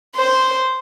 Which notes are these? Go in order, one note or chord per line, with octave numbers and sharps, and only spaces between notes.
C5